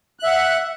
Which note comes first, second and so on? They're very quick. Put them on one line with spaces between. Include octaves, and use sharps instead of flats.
F#6 E5 F#5